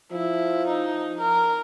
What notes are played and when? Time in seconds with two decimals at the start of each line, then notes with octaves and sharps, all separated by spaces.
0.12 F3 E4
0.67 D#4
1.20 A#4